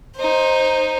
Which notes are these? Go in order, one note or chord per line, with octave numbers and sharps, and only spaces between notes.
D#4 C5